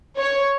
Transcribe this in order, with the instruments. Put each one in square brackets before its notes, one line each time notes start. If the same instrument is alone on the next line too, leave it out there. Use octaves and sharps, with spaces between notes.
[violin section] C#5